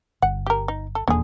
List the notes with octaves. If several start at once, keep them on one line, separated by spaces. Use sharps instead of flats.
G1 F#5
G4 A#4
D#4
A4
D#1 E2 D3 A#3 G#4